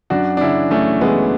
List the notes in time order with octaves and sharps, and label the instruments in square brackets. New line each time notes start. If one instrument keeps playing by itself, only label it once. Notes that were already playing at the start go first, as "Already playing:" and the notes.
[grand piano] F#2 D4 F#4
D4
C#3 C#4 E4
F#2 A3 C#4
E3 G#3 B3